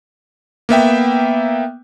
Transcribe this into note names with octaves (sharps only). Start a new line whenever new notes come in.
A#3 B3 E5 G5